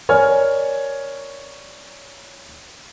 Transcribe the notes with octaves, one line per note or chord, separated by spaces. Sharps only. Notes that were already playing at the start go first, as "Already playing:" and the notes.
A#4 C#5 D5 G#5 F6